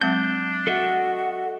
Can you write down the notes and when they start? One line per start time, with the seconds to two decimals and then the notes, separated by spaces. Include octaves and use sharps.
0.01 F#3 G#3 C4 D4 G6
0.67 F#4 A4 D#5 E5